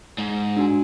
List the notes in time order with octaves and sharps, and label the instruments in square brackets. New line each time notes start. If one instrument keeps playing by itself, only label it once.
[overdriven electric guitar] G#2
[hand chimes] D4 F#4 G#5